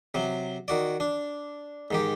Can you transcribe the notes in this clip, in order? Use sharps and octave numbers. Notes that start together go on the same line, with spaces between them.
C3 F#3
D#3 F#4 D5
D4
G#2 D#3 G4